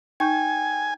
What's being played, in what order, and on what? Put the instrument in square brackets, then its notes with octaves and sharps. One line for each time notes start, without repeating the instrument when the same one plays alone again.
[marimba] D#4 C#6 G6 [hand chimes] G5 [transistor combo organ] G#5